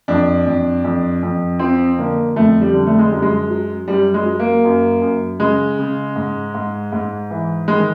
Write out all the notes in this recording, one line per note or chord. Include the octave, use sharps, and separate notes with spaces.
F2 D4
F2
F2
F2
F3 C4
D3 A#3
F2 A3
G3
D3
A3
G#3
F#2 G3
G#3
F#3
F#2 G3
G#3
F#3
A#3
F#2
F#2
C#3 G#3
C#3
G#2
G#2
G#2
E3
D#3 G#3